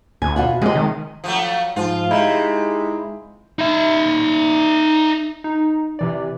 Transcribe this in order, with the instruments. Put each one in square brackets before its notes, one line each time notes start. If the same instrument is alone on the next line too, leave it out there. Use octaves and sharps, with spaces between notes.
[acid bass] D2 [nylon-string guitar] G#5
[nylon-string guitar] B2 F4 F#5
[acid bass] C3 [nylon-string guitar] G#3 D#5
[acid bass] D#3
[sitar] F3 F#3 A3
[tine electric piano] G#2 F3 [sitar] F4
[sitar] C3 [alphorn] G#3 [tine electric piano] D#4 E4
[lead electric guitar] D#4 E5
[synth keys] D#4
C3 E3 D5